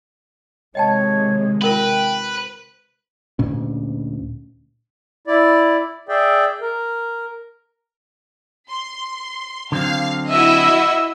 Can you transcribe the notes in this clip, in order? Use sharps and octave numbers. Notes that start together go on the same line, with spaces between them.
C3 D#3 G#3 C#5 D#5 G5 A5
F4 A#4 B4 F#5 G5
D2 A#2 C#4
E4 D5
G#4 D5 E5 G5
A#4
C6
D3 F#3 C4 F5
E4 F#4 D#5 E5